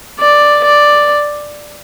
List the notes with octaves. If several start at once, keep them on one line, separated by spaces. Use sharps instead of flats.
D5
D5